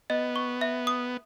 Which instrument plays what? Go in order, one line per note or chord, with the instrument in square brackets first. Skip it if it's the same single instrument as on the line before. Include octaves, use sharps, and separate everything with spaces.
[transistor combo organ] B3 [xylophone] D#5
[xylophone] C#6
E5
D#6